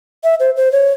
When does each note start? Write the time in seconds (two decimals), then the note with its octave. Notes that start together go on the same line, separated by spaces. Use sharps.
0.24 E5
0.40 C5
0.56 C5
0.72 C#5